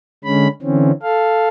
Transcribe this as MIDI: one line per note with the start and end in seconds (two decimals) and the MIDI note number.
0.24 0.48 50
0.24 0.48 56
0.24 0.48 61
0.24 0.48 83
0.62 0.91 50
0.62 0.91 52
0.62 0.91 60
0.62 0.91 61
1.03 1.49 69
1.03 1.49 77